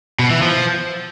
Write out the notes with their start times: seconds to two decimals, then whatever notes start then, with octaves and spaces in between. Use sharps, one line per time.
0.19 B2
0.31 E3
0.42 F3